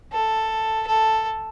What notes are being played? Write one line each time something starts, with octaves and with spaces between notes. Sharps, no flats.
A4
A4